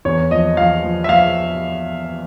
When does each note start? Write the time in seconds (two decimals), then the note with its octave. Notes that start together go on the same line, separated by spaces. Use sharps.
0.05 E2 C#5
0.31 F3 D#5
0.57 F3 F5
0.84 F3
1.04 E5
1.09 F3 F5